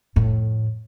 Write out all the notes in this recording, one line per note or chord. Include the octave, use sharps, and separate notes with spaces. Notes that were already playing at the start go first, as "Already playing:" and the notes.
F2 A2